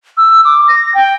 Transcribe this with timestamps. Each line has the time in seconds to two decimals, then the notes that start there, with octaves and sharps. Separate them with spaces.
0.17 E6
0.45 D6
0.68 A#6
0.94 G5